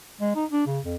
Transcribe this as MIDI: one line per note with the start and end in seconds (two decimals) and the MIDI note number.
0.21 0.34 56
0.35 0.45 63
0.51 0.66 62
0.66 0.79 49
0.85 0.96 41